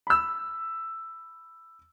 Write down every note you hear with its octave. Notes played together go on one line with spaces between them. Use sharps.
B5 E6